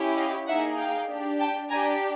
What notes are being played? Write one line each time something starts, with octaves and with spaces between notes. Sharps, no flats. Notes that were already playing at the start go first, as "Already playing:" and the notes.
Already playing: C#4 E4 G4
D#5 F5
A#3 D#4 G#4 E5 F#5
F5 G5
D4 G4
G5 A5
D4 G4 G#5 A#5